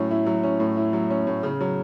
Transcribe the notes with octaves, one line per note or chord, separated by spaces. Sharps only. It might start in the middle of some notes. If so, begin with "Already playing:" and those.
Already playing: A2 F#3 C#4 E4
E4
F#3
C#4
A2
E4
F#3
C#4
A2
C#3
F#3